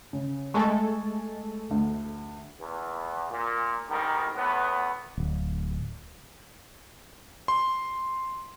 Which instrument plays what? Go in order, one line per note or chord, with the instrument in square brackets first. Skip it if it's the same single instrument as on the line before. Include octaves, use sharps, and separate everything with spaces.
[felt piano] C#3
[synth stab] G#3 A3 A4 [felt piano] G#5 A5 C#6
[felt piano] D2
[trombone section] E2
A#2
D2 G#2 D#3 G3 A#4
E2 A2 B3
[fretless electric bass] D1
[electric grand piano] C6